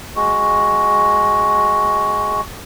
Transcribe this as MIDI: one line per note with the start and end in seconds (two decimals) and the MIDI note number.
0.16 2.41 56
0.16 2.41 66